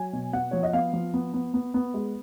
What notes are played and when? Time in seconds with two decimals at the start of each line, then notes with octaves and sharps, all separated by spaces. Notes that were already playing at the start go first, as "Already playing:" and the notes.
Already playing: F#3 G#5
0.13 B2
0.33 B3 F#5
0.51 F3 C#5
0.63 D#5
0.73 B3 F5
0.93 F3
1.14 B3
1.34 B3
1.54 B3
1.74 B3
1.94 G#3